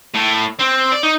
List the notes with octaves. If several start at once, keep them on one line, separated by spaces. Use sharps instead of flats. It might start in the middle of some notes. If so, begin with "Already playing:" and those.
A2
C4
D5
D#4